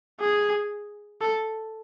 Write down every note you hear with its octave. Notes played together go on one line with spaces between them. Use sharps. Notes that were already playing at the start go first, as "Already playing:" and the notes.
G#4
A4